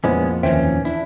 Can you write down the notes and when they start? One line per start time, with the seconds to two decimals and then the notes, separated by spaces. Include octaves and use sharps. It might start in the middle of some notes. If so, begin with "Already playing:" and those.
0.04 F2 A#2 G#3 B3 C#4 E4 C5 D#5
0.43 D#2 D#3 E3 C#4 C5 E5 G5
0.85 D4 E4